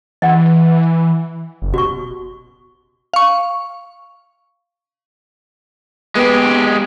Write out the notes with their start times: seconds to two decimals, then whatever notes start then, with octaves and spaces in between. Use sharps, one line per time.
0.22 E3 D#5 F#5
1.62 F#1
1.74 B2 F#4 C#6
3.14 F5 C#6
6.15 G#3 B3 G4